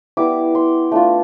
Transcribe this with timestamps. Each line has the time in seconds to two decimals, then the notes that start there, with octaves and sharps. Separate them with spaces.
0.17 G3 B3 E4 D6
0.55 C6
0.92 A3 D4 F4